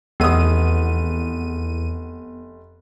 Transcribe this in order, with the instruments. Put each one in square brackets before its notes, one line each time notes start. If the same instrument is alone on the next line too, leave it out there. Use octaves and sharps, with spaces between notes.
[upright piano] F1 D#6 [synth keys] E2 D#7 [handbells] B3